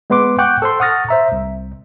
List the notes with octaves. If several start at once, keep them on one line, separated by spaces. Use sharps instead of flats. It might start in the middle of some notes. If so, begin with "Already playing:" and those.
G#3 B3 B4 C6 D6
F#5 G5 C#6 D6 F#6 G6
A4 C5 C6
F#5 C#6 D#6 F6 A6 A#6
C5 E5 A#5
C2